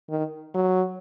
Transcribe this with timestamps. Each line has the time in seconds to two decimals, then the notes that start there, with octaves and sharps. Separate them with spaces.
0.10 D#3
0.55 F#3